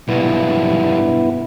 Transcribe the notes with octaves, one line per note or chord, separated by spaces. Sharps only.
B1 G2 B3 E4